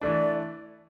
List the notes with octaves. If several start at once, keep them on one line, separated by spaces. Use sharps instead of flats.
E3 A3 D4 D5